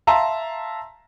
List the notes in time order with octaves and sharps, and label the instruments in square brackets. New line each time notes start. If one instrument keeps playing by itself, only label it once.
[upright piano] E5 F5 A5 A#5 C6 E6